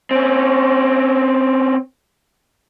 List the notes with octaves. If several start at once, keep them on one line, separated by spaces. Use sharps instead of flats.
C4 C#4